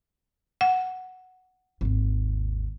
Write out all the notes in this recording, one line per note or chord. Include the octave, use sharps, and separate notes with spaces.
F#5
G#1 D#2